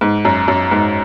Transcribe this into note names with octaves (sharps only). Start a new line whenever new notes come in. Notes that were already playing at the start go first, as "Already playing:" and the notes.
G#2
F#2
F#2
G#2